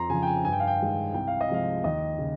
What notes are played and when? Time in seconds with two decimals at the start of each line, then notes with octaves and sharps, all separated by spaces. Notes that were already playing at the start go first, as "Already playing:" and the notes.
Already playing: F2 A#5 C6
0.10 C#3 F3 G#5
0.22 G5
0.27 G#5
0.44 G2 G#5
0.52 G5
0.60 F5
0.67 G5
0.80 D#3 G#3
1.14 C2 G5
1.28 F5
1.41 D#5
1.49 C3 F3 G#3 F5
1.84 D#2 D#5
2.18 C#3